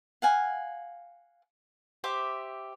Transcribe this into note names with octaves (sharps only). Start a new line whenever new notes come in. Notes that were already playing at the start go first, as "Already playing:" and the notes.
F5 F#5 G#5
G4 C5 E5 D6